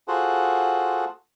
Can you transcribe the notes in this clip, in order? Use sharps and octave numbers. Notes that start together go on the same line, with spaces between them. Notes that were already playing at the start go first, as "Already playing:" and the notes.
F4 F#4 G#4 A4 C5 F#5